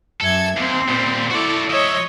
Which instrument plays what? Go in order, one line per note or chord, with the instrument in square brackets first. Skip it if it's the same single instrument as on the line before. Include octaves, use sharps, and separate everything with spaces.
[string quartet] F#2 E5 G#6 [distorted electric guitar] A4
[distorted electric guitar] D#2 [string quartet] C4 C5
[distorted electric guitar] A#2 G3
[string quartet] E4 A4 [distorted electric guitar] F#4 D5
[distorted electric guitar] F3 E5 [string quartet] C#5 D#5 D#6